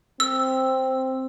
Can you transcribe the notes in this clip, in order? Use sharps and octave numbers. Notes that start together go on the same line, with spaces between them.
C4 E6